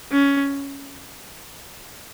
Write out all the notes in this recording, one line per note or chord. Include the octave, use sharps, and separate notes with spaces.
C#4